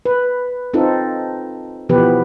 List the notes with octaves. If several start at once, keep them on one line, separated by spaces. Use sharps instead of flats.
B4
C4 D#4 F4 A4
B2 E3 F3 B3 G4 B4